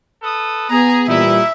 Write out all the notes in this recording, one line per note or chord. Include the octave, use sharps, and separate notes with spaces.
A4 B4 D#6
B3 G#4 A#5
A#2 E3 G3 D#4 E4 E5